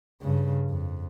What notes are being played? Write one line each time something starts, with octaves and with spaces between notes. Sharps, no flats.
G2 C#3
F2